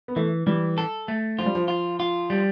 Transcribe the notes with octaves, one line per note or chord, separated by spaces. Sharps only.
B3
E3 A3
E3 G3
A4
A3
F3 F4
G3
F3
F4
F4
G3